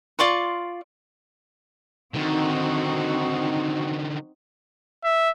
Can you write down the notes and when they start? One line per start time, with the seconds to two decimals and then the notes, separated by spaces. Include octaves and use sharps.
0.19 F4 D5 C6 C#6
2.14 D3 D#3 C4 D#4 F#4
5.04 E5